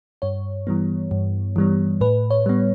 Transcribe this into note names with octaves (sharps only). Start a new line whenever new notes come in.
G2 C#5
E3 G3 B3
G2
E3 G3 B3
A2 B4
C#5
G3 B3